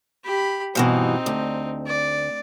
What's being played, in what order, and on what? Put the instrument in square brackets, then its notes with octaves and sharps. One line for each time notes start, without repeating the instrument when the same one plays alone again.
[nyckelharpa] G4 B5
[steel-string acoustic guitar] G2 B2 E3 [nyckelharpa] C4 D#4
[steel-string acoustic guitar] D2
[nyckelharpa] D5